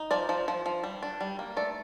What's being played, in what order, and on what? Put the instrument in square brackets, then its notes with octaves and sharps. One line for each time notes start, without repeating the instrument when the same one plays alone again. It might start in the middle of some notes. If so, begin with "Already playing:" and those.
Already playing: [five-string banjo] D#4
F3 D5
F3
F3
F3
G3
D4
G3
A#3
A3 D5